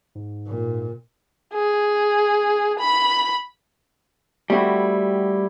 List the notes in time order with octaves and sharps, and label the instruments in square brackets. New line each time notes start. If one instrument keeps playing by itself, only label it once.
[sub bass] G#2
[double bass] A#2
[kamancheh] G#4
B5
[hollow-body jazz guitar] G3 A3 C4 E4 F#4